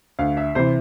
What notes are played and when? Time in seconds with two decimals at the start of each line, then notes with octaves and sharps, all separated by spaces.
0.19 D2 F5
0.37 E5
0.55 C3 E3 C5